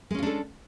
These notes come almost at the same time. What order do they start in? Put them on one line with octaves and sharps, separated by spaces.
G#3 C#4 F4 D4 A4